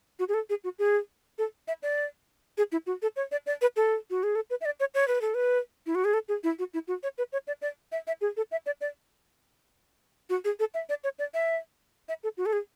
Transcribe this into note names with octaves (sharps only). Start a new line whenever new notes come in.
F#4
G#4
A4
G#4
F#4
G#4
A4
E5
D5
G#4
E4
F#4
A4
C#5
D5
D5
B4
A4
F#4
G#4
A4
B4
E5
D5
C#5
C#5
B4
A4
B4
E4
F#4
G#4
A4
G#4
E4
F#4
E4
F#4
C#5
B4
C#5
D5
D5
E5
E5
G#4
A4
E5
D5
D5
F#4
G#4
A4
E5
D5
C#5
D5
E5
E5
A4
F#4
A4
G#4